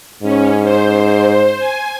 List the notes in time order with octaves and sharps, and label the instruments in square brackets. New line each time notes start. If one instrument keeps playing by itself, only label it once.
[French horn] G#2 [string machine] C#4
[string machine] C5
G#5